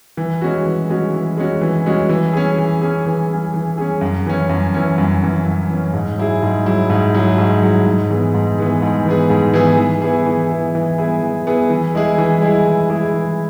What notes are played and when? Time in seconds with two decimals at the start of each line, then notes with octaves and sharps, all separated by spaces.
0.17 E3
0.41 G#3 C#4 F#4
0.65 E3
0.90 G#3 C#4 F#4
1.13 E3
1.37 G#3 C#4 F#4
1.61 E3
1.86 G#3 C#4 F#4
2.09 E3
2.33 C#4 G#4
2.58 E3
2.82 C#4 G#4
3.06 E3
3.29 C#4 G#4
3.54 E3
3.78 C#4 G#4
4.01 F#2
4.26 E3 C#4
4.49 F#2
4.74 E3 C#4
4.98 F#2
5.22 E3 C#4
5.46 F#2
5.70 E3 C#4
5.93 G#2
6.18 F#3 E4 G#4
6.42 G#2
6.66 F#3 E4 G#4
6.90 G#2
7.14 F#3 E4 G#4
7.38 G#2
7.62 F#3 E4 G#4
7.86 G#2
8.10 E3 B3 G#4
8.34 G#2
8.58 E3 B3 G#4
8.82 G#2
9.06 E3 B3 G#4
9.30 G#2
9.54 E3 B3 G#4
9.78 E3
10.02 B3 E4 G#4
10.26 E3
10.51 B3 E4 G#4
10.75 E3
10.98 B3 E4 G#4
11.23 E3
11.47 B3 E4 G#4
11.70 E3
11.95 G#3 E4 G#4
12.18 E3
12.42 G#3 E4 G#4
12.67 E3
12.90 G#3 E4 G#4
13.14 E3